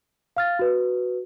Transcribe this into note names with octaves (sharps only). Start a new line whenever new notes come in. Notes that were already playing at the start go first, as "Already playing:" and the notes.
F5 F6 A6
F#4 B4